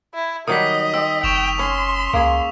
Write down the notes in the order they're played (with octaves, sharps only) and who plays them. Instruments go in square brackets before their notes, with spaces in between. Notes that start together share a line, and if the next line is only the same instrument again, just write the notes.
[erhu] E4
[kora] D#3 F#3 G3 [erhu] D#5 [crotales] D#6 B6
[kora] C4 [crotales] E6
[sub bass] F#1 [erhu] G5 [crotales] C#6 E7 F7
[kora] C#4 [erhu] C6
[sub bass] C#2 [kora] A#3 G#4